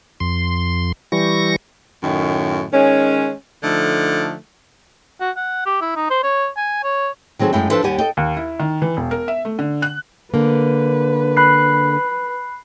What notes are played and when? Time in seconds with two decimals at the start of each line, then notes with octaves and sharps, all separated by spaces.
0.20 F2 C6
1.12 E3 G3 C#6 A#6
2.03 F#2 A2 D#3
2.73 D#3 G#3 C#4
3.63 D3 F3 A3 D#4
5.21 F#4
5.37 F#5
5.66 G4
5.81 E4
5.96 D#4
6.10 C5
6.23 C#5
6.57 G#5
6.84 C#5
7.39 D#3 F#3 C4 G#4 A4
7.53 F#2 G#3 A3 E4 G5
7.70 F3 D4 E4 A4 B4 C5
7.84 D#2 G3 G4 F#5 G#5
7.98 A4 D#5 G5
8.17 D#2
8.37 E4
8.60 D#3
8.82 E3
8.97 E1
9.11 A#4
9.28 E5
9.45 A3
9.59 D3
9.82 F#6
10.34 D3 A#3 B4
11.37 B5 F#6 C7